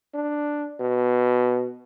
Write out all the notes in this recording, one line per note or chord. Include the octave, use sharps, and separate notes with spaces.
D4
B2